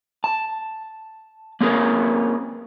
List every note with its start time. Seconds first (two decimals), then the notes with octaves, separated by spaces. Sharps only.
0.24 A5
1.61 A#3 C4 C#4 F4 G#4 A#4